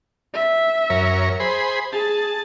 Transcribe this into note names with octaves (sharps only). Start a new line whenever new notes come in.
E5
F#2 A#4 C#5
G#4 C5 B5
G#4 A5